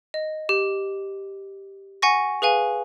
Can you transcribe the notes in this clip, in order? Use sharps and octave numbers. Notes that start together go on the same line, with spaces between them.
D#5
G4
F#5 G#5 C#6 A#6
G#4 B4 F5 G#5